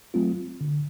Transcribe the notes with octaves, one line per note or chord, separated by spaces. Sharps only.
F#3 A3 C4 F4
D3